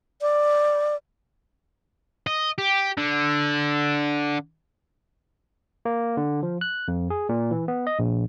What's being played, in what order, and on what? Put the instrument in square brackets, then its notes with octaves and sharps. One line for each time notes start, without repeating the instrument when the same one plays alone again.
[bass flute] D5
[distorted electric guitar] D#5
G4
D3
[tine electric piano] A#3
D3
F3
F#6
F2
G#4
A#2
E3
B3
D#5
A#1